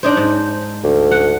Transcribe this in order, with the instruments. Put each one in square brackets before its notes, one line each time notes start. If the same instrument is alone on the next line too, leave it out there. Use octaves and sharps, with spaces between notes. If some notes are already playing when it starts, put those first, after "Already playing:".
[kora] D4 D#4 C5
G#2
[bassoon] D2
[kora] F#5